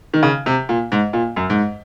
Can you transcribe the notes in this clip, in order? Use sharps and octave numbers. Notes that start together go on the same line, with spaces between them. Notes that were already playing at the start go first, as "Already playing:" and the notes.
D#3
C#3
C3
A#2
G#2
A#2
F#2
G#2